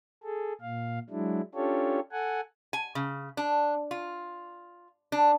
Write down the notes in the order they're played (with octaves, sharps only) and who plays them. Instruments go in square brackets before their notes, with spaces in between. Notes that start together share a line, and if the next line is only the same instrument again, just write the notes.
[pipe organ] G#4 A4
A#2 F5
F#3 G#3 D4 E4
C#4 D4 F4 G4 A4 C#5
A4 F#5 G#5
[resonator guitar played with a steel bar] G#5
C#3
D4
F4
D4